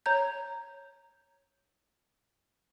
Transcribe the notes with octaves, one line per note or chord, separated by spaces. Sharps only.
C#5 A#5 G6